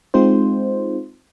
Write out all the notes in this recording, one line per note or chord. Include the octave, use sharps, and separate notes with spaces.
G#3 C4 D#4 F4 C5